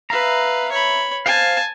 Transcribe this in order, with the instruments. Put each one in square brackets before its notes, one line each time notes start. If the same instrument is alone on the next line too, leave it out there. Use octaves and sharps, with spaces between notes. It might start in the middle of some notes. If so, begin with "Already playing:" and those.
[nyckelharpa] B4 F5 [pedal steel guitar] E5 A#5
[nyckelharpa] C#5 B5
[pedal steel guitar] C5 F5 [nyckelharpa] G#5 A5